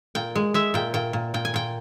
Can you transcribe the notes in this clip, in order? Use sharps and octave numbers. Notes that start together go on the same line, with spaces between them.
A#2 G5
G#3
G#3 E5
A#2 G5
A#2 G5
A#2
A#2 G5
G#5
A#2 G5